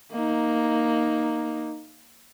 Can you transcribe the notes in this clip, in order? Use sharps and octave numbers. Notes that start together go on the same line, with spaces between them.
A#3 D#4